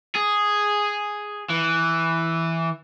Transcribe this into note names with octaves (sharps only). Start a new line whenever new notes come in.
G#4
E3